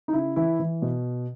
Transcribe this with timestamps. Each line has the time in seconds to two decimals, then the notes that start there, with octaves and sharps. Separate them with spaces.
0.08 D#4
0.13 C#3 E4
0.36 E3 E4
0.59 E3
0.82 B2